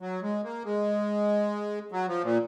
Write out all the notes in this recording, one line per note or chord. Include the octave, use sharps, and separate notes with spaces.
F#3
G#3
A#3
G#3
F#3
F3
A#2